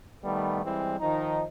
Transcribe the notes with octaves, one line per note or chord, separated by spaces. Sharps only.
D#3 G3 A3 B3
E3 G3 G#3 C4
D#3 F3 D#4